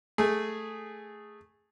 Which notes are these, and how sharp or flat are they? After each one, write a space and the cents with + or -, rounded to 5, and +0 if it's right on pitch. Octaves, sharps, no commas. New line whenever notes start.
A3 +0 G#4 -5